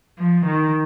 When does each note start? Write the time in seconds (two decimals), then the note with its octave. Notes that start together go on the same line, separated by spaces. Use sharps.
0.19 F3
0.46 D#3